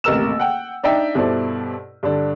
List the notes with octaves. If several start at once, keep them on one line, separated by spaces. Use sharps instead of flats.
D#1 A1 C3 A#4 E6 E7
F#5 G5
D4 D#4 D5 E5 G5
G2 B2 E4 A4 C5 D5
G2 D3 D4